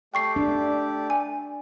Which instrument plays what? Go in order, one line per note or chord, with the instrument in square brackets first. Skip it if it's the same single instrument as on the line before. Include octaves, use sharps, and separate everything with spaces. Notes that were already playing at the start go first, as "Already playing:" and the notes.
[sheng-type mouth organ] A3 G4 D5 [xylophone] G5 C#6 C7
[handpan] D4
[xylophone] G#5